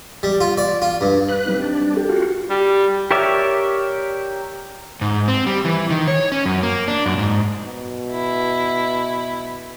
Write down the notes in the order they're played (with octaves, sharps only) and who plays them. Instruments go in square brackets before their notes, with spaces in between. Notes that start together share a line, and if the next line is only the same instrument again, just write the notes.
[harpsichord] G3
F4
D5
F4
G2
[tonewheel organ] B4 F#6
[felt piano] G3 C4 D#4
[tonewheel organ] D4
[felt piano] G4 A4 A#4
[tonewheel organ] F4 F#4
[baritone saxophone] G3
[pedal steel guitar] G4 A#4 C#5 D5 E5
[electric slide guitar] G#2
C4
G3
E3
D#3
C#5
C#4
F#2
A#3
D4
F#2
G#2
[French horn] B2
[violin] E4